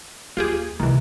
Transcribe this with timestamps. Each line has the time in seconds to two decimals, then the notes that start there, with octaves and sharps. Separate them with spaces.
0.37 D#2 F4 G4 G#4
0.80 C2 D#3 E3